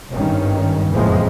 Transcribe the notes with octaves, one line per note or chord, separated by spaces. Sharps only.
G#1 G2 D#3 C#4
F#1 F2 A2 E3 F3 G#3